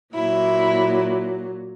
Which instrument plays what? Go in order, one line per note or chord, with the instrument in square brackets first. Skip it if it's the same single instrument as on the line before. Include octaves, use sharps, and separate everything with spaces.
[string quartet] A#2 F#3 E4